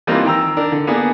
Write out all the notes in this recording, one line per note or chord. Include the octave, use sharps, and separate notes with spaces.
E3 G3 A#3 C4 D#4 F4
D#3 G5 A#5 E6
D4 A#4
D3
A#3 B3 D4 G#4